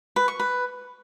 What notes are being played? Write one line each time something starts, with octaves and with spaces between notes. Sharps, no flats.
B4
C#6
B4